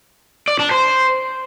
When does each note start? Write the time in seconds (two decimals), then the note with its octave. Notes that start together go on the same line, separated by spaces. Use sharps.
0.48 D5
0.59 D4
0.71 C5